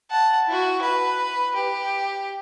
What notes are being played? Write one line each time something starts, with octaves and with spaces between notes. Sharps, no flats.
F#5 A5
E4 F#4
B4
G4